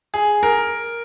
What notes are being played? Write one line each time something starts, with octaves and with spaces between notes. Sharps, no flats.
G#4
A#4